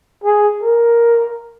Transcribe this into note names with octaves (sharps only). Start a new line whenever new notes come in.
G#4
A#4